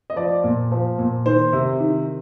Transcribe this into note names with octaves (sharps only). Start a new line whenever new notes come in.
D#5
F3 D5
A#2
F3
A#2
D#3 C5
C3
D#3